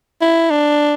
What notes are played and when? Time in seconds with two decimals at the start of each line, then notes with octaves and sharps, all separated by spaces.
0.21 E4
0.50 D4